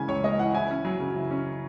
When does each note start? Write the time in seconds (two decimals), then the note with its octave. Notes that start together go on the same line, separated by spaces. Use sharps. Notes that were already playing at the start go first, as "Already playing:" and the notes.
Already playing: C#3 E3 G#3 G#5
0.08 C#2 C#5
0.24 G#3 D#5
0.38 E3 F#5
0.54 E4 G#5
0.70 C#4
0.85 F#3
1.00 C#3
1.15 E4
1.31 C#4